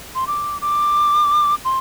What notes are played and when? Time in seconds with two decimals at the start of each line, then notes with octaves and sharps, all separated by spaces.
0.15 C6
0.27 D6
0.62 D6
1.65 C6